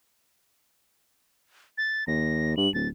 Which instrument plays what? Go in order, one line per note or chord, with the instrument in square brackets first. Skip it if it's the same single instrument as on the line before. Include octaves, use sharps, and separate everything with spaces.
[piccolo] A6
[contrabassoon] D#2 [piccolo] A#6
[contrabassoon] G2 [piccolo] F#7
[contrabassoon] D1 [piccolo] A6